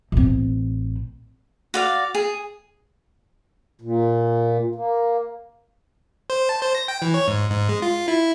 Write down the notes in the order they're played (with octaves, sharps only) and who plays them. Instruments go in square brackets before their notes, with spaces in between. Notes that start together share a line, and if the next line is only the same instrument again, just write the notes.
[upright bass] A1 C4
[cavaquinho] F#4 D5 F5
G#4
[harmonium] A#2
A#3
[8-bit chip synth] C5
A5
C5
A#6
G5
E3
C#5
G#2
G#2
G#3
F4
E4